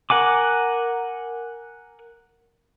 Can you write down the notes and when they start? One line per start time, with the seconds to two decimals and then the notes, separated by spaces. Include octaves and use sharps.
0.10 A#4 F#5 G#5 D6